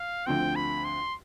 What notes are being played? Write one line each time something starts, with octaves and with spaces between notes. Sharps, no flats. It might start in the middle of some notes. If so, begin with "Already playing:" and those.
Already playing: F5
D2 D3 F3 C4 G5
B5
C6